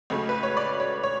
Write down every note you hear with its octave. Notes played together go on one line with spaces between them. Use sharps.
C#2 C#3 F#3 A3
B4
C#5
D5
C#5
C#5